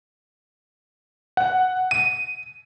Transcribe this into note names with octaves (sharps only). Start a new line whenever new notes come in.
F#5
D#7